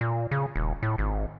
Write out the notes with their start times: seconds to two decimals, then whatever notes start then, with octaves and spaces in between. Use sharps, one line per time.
0.01 A#2
0.31 C#3
0.56 D#1
0.83 A2
0.98 G#1